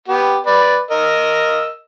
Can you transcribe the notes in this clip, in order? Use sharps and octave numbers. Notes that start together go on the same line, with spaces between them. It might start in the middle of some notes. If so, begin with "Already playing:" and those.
B3 G4
B4 D5
A#4 D#5 E6